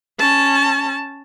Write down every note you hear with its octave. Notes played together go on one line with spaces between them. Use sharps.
C#4 A5